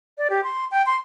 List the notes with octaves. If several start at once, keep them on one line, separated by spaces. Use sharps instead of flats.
D5
G4
C6
G5
C6